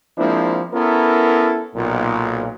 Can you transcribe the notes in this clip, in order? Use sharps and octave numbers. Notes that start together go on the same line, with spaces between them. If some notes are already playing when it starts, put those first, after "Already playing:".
F3 G#3 A#3 C4 D4 E4
B3 C#4 E4 A4 A#4
B1 A#2